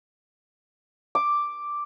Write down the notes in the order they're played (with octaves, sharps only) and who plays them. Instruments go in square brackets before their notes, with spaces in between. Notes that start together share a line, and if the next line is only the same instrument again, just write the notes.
[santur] D6